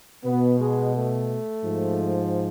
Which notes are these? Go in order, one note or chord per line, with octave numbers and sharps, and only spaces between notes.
B2 B3
G#3
A3
G#2 F3